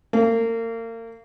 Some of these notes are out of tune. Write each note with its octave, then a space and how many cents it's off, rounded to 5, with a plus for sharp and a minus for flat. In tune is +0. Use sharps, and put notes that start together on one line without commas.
A#3 -35